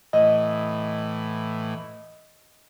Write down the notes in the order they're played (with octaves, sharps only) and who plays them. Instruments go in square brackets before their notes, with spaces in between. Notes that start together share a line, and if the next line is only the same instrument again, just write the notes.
[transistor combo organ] A2 E3 [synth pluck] D#5